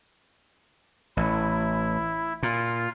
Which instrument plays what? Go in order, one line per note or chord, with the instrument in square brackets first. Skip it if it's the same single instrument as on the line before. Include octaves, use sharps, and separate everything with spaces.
[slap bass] A1 [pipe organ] E4
[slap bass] A#2 [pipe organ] F4